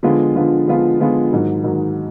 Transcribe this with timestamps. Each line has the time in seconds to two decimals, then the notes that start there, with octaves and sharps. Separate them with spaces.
0.03 D3 F3 G#3 B3 F4
0.35 D3 F3 G#3 B3 F4
0.68 D3 F3 G#3 B3 F4
1.00 D3 F3 G#3 B3 F4
1.32 G#2 D#3 F#3
1.64 G#2 D#3 F#3